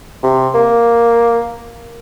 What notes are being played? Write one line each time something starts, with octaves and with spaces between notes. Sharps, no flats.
C3
A#3